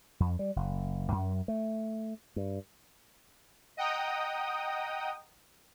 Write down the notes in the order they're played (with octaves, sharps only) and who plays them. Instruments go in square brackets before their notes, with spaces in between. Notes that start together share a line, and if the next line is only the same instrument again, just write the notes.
[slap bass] F2
G3
F#1
F#2
A3
G2
[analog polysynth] D#5 F#5 G5 A#5 D#6